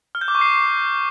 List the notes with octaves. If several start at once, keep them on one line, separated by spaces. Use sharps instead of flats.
F6
G6
D6
C#6
C7